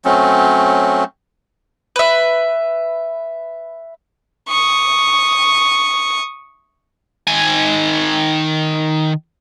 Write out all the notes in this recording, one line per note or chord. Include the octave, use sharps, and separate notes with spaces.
F#3 A3 C4 C#4
B4 E5
C#6 D#6
D#3 G#5